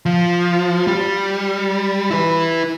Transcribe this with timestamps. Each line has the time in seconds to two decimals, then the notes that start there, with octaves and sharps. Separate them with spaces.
0.06 F3
0.87 G3
2.11 E4 B4